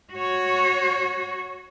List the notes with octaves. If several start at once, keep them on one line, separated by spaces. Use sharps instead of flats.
F#4 C#5